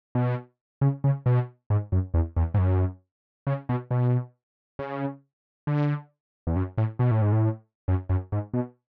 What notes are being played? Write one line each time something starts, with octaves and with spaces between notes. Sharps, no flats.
B2
C#3
C#3
B2
G#2
F#2
E2
E2
G#2
F#2
C#3
B2
B2
C#3
D3
E2
F#2
A2
B2
A2
G#2
A2
F#2
F#2
G#2
B2